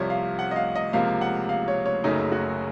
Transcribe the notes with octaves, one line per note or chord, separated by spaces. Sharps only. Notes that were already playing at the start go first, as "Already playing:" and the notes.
Already playing: C2 C3 F3 C#5
F5
F#5
D#5
F5
D#5
C#2 C3 F3 A#3 F5
F#5
F5
C#5
C#5
F#1 F#2 C#3 F#3 A3 D#4
F#4